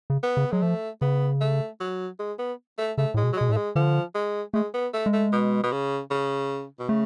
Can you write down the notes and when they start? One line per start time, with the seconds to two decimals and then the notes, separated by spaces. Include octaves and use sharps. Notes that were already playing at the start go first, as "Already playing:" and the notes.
0.10 C#3
0.23 B3
0.37 C#3
0.51 F#3 G#3
0.62 F3 A3
1.01 C#3 B3
1.40 A3
1.80 F#3
2.19 G#3
2.39 B3
2.78 A3
2.98 C#3 A3
3.14 A2 G#3
3.23 B2
3.33 F#3
3.36 B2 G#3
3.49 A2
3.52 A3
3.56 G#3
3.75 D3 F3
4.15 G#3
4.54 G#3 A3
4.74 B3
4.94 A3
5.06 G#3
5.13 A3
5.32 B2
5.63 B2
5.72 C#3
6.11 C#3
6.79 B2
6.89 C#3 A3